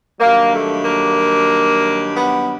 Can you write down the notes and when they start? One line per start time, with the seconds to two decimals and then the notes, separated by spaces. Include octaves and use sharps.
0.20 G2 D#3 F#3 A#3
0.52 A3
0.84 A#3
2.14 B3